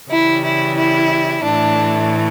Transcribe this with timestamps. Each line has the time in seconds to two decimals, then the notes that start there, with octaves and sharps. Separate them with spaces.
0.10 C#3 E3 G3 E4
0.44 E4
0.77 E4
1.44 A2 E3 A3 D4